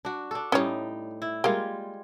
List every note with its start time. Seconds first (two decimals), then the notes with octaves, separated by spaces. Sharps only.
0.05 D4 F#4
0.31 D4 A4
0.52 A2 G3 C#4 D#4 C#5
1.22 E4
1.44 G3 G#3 A#3 F4 F5